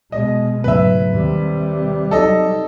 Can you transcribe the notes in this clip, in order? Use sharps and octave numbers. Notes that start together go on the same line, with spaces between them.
B2 G#3 D#5
D2 G#2 C#3 F#3 B4 E5
D#2 C3 D#3 G3
F#3 D#4 A4 D#5